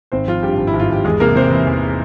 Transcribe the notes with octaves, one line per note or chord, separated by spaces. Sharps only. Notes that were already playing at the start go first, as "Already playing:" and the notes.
G#1 C4 C5
F3 F4
G2 G3 G4
G#1
E4
G#1
F4
G#1 G4
E2 G#3 G#4
C3 A#3 A#4
C3 C4 C5
E3
E2